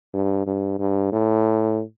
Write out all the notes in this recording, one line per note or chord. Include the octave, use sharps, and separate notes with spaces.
G2
G2
G2
A2